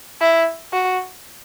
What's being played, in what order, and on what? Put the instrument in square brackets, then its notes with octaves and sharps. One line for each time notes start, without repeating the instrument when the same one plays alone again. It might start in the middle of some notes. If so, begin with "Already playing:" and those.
[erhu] E4
F#4